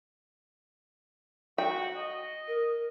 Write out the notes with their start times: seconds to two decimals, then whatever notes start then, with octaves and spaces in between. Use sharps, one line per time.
1.58 F#4 G5
1.97 D#5
2.47 A#4